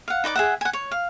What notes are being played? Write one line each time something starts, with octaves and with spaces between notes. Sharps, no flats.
F5 F#5
D#4 B4 D5 D6
G#4 E5 F#5
F#5 G#5
C#5
F5